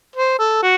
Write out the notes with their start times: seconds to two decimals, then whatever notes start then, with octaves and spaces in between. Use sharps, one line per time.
0.16 C5
0.39 A4
0.62 F#4